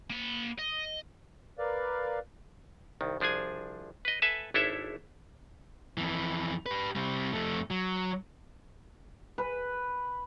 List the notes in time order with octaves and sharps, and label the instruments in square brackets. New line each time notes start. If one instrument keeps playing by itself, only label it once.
[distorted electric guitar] A#3 B5
D#5
[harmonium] A#4 B4 D5 F5
[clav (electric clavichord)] C2 D#3
C2 F3 D4 G#4 G#5
B4 D#5
A4 B4 E5 G#5 A5
G#1 D4 E4 A4 C#5 E5
[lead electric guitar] F2 E3
G4 B4
C3 G3
F2 A3
F#3
[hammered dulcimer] B4